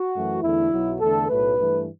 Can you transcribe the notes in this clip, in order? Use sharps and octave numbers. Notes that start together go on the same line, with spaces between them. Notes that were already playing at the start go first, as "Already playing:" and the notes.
Already playing: F#4
F#2 E3 A3
E2 D3 A3 E4
B1 B2 F#3
E2 D3 A3 A4
B1 A2 F#3 A3 B4
G2 E3 A3